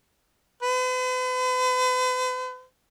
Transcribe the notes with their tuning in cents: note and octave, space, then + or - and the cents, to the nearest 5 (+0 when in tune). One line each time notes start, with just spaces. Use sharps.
B4 +45